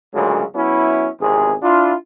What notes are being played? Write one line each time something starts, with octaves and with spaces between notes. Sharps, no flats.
D2 A#2 C#3 F#3 G#3
F#3 B3 C#4 E4
G#1 E2 C3 G#4
D4 E4 F4